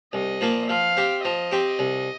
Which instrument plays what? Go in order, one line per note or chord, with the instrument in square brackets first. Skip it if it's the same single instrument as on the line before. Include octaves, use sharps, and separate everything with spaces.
[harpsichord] C2 [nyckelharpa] D#5
[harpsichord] A#2 F3 A#3
[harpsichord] F3 [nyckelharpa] F5
[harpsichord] C4 G4
[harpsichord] F3 [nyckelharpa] D#5
[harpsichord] C4 G4
C2